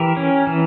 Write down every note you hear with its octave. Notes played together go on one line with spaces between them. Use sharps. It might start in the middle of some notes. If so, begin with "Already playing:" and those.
Already playing: E3 G4 A#4
C#4
E3